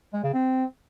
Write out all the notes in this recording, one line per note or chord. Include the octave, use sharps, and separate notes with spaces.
G#3
C#3
C4